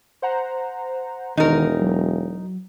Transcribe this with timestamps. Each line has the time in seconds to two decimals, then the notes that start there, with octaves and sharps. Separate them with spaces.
0.22 C5 F#5 A#5
1.37 E1 D#3 D#4 A#4
1.81 F#3